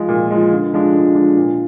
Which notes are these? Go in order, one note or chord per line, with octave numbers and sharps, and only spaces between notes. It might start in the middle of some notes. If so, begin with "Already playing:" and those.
Already playing: F3 G#3
A#2
F3 G#3
D3
F3 G#3 D4
D3
F3 G#3 D4
A#2